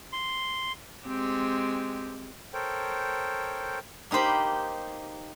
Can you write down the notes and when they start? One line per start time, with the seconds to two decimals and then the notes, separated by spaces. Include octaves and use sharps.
0.13 C6
1.05 G#3 C4 G4
2.53 A4 A#4 C5 C#5 G5
4.11 A#3 D#4 G4 C5 B5